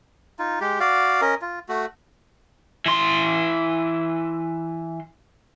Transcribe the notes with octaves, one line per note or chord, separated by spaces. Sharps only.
D#4 F4
G#3 G4
F#4 D5 F5
C#4 A#4 D#5
F4
A3 F#4
E3 C6